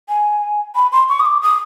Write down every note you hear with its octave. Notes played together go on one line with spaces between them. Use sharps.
G#5
B5
C6
C#6
D#6
D6
D#6